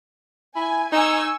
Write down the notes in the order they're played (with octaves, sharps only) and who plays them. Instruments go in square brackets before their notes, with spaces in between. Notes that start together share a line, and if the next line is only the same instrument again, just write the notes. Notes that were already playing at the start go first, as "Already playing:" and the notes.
[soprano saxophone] E4 [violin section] G#5
[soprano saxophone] D#4 [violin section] G#5 C#6 E6